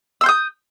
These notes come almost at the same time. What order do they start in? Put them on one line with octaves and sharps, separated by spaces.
E6 C6 G6 D#6